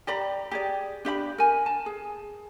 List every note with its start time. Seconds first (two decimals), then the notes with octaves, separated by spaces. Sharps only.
0.07 G4 D5 A#5 B5
0.51 G4 G#4 D5
1.05 D4 G4 D#5 B5
1.38 A#4 G#5
1.66 A5
1.86 G#4